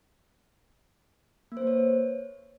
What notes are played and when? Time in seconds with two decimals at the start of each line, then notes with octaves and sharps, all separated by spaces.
1.52 A#3
1.57 C5
1.62 B4
1.67 C#5